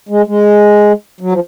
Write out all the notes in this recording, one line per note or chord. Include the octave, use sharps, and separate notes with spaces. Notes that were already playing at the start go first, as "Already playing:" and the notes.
G#3
G#3
F#3
F3